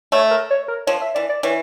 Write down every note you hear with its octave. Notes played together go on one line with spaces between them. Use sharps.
A3 C#5
A#4
C#5
A#4
F3 C#5
E5
E3 D5
D5
E3 C#5